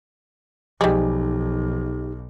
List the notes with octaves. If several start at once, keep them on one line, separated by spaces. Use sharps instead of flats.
B1 F3 G3 G#3 D#4 G4